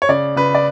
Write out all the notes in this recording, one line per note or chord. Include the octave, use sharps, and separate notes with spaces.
C#5
C#3 D5
C#3 B4
D5